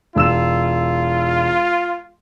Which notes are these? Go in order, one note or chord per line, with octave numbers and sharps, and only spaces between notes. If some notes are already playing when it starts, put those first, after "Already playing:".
E1 F4 E6 E7